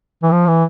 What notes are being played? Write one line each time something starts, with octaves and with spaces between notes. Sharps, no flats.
E3
F3
E3